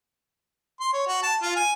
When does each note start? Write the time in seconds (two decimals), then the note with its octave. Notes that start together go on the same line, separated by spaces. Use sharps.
0.81 C6
0.93 C#5
1.07 F#4
1.23 A5
1.42 F4
1.56 G#5